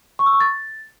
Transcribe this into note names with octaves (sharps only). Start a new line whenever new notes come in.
C#6
E6
C#6
A6